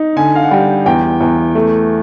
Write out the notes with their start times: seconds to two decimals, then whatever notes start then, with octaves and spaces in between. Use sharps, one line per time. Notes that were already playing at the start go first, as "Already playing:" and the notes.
Already playing: D#4
0.16 D3 G#5
0.35 F5
0.43 F#5
0.51 G3 G5
0.86 E2 G5
1.21 E2
1.55 A3